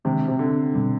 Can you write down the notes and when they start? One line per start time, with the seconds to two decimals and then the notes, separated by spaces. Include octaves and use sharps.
0.05 C3 D#3 G#3 D4
0.28 C3
0.39 D3
0.74 B2 G3 C4